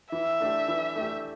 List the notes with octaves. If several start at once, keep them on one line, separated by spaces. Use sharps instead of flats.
E3 E5
A3 D4 G4
E3
A3 D4 G4